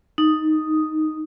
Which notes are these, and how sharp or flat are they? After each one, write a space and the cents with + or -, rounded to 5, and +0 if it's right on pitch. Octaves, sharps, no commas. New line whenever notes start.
D#4 +0 D#6 +0